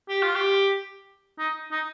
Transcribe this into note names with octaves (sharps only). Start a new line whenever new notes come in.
G4
F4
G4
D#4
D#4